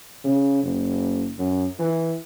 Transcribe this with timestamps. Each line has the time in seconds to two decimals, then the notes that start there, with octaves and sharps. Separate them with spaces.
0.24 C#3
0.63 F#1
1.38 F#2
1.79 E3